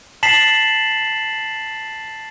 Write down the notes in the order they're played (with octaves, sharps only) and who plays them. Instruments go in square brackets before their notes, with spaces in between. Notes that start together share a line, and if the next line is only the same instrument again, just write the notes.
[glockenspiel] A5 A6 B6 C7 E7 F#7